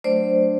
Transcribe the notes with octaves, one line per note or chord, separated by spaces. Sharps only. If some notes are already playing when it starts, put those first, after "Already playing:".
F#3 A3 D4 C5 D5